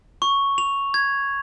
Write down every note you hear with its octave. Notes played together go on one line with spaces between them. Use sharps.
C#6
F7
G#6